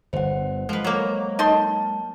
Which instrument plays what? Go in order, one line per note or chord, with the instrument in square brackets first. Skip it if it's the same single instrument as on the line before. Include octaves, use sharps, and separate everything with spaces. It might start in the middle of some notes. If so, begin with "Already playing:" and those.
[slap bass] G1 [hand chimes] C5 F#5
[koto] F3 B4 [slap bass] G#3
[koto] F#3 A#3
[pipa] D#4 A4 C6 [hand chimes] A5